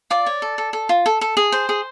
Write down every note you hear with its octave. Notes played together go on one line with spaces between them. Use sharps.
F4 D5 D6
C#5
A4
A4
A4
F4
A4
A4
G#4
C5
G#4